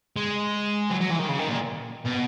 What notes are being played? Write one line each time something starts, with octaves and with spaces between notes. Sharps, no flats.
G#3
F#3
F#3
E3
D#3
C#3
D#3
A#2
B2